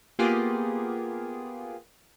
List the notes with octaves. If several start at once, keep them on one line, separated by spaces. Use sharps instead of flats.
A#3 B3 F4 G4 G#4